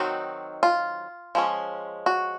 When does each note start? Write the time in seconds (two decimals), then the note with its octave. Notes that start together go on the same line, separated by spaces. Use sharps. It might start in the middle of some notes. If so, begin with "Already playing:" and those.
Already playing: D#3 F#3 C4 D#4 F#4
0.63 F4
1.35 F3 G#3 C#4
2.06 F#4